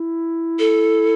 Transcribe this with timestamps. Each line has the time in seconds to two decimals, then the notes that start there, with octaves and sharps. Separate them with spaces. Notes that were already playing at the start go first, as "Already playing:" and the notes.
Already playing: E4
0.59 A4